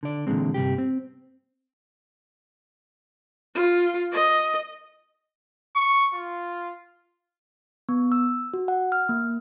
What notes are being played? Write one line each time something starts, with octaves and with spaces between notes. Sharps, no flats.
D3 D5
A#2 D3 E3 F#3 G#3 C4
G2 C3 G4
C4
F4
D#5
C#6
F4
B3
E6
F#4
F#5
F6
A#3